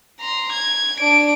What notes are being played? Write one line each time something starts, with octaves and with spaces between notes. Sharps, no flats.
A#5 C6
G#6
D4 D7